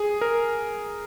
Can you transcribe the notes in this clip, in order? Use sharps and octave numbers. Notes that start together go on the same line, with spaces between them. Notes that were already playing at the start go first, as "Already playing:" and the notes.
Already playing: G#4
A#4